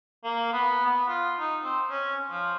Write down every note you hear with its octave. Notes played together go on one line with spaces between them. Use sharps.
A#3
B3
B3
F4
D#4
C4
C#4
F3